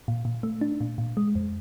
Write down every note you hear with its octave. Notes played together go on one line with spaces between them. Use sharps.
A#2
A#2
A3
D4
A#2
A#2
G#3
F2